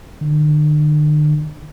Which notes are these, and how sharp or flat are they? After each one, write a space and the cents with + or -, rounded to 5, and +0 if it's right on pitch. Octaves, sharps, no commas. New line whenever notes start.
D3 +45